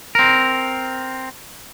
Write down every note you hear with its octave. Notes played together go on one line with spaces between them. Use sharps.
C4 A#4